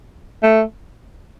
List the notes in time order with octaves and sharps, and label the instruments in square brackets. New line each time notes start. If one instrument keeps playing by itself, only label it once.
[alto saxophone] A3